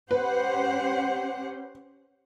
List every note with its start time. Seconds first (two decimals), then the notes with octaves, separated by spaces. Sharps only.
0.11 C#4 G4 B4 C5 F#5